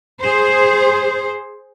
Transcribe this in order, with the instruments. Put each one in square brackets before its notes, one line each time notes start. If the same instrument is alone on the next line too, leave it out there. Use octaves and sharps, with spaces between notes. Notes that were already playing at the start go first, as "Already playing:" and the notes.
[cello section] G#4 C5